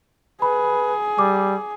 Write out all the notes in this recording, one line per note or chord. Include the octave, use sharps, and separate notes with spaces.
G#4 B4 B5
G3 D6